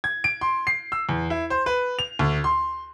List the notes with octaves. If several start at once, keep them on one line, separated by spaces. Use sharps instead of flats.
G#6
D7
C6
C7
E6
E2
E4
C5
B4
F7
D2
C6